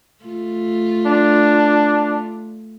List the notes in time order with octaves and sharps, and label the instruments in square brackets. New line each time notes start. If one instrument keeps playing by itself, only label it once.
[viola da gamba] A3 F4
[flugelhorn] D4